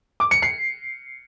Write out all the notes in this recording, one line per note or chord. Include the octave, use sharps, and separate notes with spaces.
D6
C#7
C7